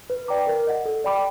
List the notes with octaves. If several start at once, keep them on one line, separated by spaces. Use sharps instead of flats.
B4
D5 G5 A#5 D6
A#4
D#5 F#5
A4
D5 G5 B5 D6